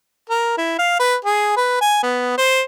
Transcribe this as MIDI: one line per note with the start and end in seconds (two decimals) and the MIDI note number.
0.29 0.53 70
0.58 0.75 64
0.79 0.95 77
0.99 1.16 71
1.25 1.56 68
1.56 1.80 71
1.81 2.02 80
2.03 2.34 59
2.38 2.62 72